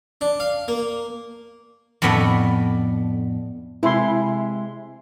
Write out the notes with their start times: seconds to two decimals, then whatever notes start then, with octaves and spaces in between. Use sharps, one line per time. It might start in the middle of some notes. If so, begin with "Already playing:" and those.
0.21 D4
0.40 F5
0.68 A#3
2.02 F2 A2 A3 B3 D4 A4
3.83 C3 G#3 E4 C6